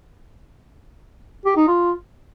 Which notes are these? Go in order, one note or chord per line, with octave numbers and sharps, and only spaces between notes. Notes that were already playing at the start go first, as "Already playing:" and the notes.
G4
D#4
F4